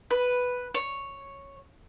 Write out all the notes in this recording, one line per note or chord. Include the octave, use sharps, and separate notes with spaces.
B4
C#5